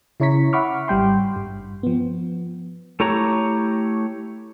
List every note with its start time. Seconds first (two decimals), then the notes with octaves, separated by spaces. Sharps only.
0.20 C#3 E4 C#5 A#5 C#6 B6
0.53 E5 F#5 B5 C#6 D6 F6
0.88 G#1 G3 G5 C6
1.36 G2
1.83 F3 B3
3.00 A3 E4 G4 C#5 A#5